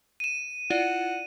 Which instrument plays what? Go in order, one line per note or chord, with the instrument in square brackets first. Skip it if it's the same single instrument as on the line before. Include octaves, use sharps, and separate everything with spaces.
[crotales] D#7 E7
[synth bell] E4 F4 D5 [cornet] F#5